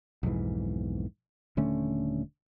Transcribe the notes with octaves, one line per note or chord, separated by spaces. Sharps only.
B1 F2 G#2 E3
D#1 D3 A3 C#4